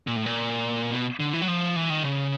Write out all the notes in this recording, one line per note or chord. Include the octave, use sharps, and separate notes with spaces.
A#2
A2
A#2
B2
D3
E3
F#3
F3
E3
D#3
C#3